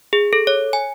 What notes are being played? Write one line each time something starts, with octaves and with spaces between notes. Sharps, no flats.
G#4
A4
C#5
G#5